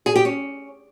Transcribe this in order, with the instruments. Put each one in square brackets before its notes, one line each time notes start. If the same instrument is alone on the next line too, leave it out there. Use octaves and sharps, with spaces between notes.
[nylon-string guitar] G#4
G4
C#4